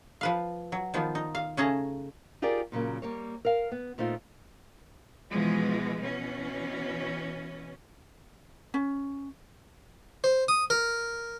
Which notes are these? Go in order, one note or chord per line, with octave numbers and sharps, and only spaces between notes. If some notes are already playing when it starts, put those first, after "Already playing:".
F3 B4 F5
F#3
D#3 F3 B3 F4
D#4
F5
C#3 A3 C#4 G#4 A5 A#5
D#4 F4 G4 G#4 A#4 D5
A#2 C#3 F#3 A#3
G3 A#3 C#5
A#4 F5
B3
A#2 A3 C4 D#4 F4
B2 E3 F3 G#3
B2 E3 C#4
C#4
C5
D#6
A#4